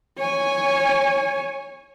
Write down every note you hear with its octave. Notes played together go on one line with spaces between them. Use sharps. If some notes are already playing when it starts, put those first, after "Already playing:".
C#5 G#5